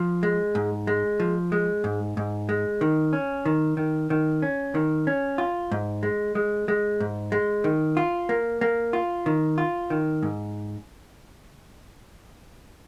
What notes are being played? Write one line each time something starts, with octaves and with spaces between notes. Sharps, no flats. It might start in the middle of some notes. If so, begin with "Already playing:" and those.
Already playing: F3
G#3
G#2
G#3
F3
G#3
G#2
G#2
G#3
D#3
C#4
D#3
D#3
D#3
C#4
D#3
C#4
F4
G#2
G#3
G#3
G#3
G#2
G#3
D#3
F4
A#3
A#3
F4
D#3
F4
D#3
G#2